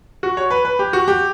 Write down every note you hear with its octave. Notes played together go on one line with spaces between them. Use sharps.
F#4
C#5
B4
B4
G4
F#4
G4